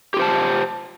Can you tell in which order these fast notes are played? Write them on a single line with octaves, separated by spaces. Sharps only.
G4 F4 C5 A5